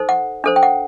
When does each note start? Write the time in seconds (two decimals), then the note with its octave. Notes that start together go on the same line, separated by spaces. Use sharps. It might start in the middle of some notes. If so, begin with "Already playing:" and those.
Already playing: D#4 A4 C5
0.09 F#5
0.44 D4 A4 C5
0.56 G5
0.63 F#5